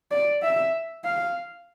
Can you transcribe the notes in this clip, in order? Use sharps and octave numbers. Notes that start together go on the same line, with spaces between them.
D5
E5
F5